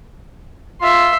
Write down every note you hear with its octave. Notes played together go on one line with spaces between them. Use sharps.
F4 E5 C6